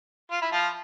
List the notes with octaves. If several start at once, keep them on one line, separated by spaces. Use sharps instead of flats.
F4
E4
F3 F4